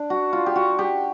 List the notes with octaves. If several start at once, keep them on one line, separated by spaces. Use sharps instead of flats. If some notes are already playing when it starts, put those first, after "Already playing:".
Already playing: D4
F#4
F4
G4
F#4
G4